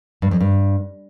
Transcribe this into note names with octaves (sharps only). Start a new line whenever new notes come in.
G2
F2
G2